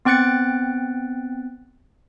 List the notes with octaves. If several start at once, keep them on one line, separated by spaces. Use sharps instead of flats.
B3 C4 G5 F#6 A6 C#7